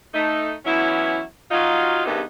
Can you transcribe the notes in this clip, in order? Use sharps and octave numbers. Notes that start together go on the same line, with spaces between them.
A3 D#4
E3 F#3 B3 C#4 E4
F#3 D#4 F4
E2 G2 C3 A#3 B3 D#4